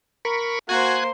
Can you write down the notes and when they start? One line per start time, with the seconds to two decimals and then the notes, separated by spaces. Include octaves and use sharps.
0.25 A#4 B5 C#6
0.69 A#3 F#4 C5 G#5 F#6 G#6